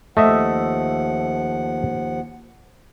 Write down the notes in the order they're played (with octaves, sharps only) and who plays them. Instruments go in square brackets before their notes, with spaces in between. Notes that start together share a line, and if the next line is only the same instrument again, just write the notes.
[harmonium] D#2 F3 F#5 [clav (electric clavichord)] A3 D#5 E5